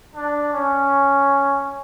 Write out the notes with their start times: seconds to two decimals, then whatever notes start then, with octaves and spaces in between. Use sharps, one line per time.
0.15 D4
0.53 C#4